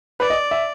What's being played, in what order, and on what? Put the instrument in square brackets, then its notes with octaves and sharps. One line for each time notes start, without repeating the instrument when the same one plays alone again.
[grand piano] B4 [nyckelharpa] D5
[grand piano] D#5
E5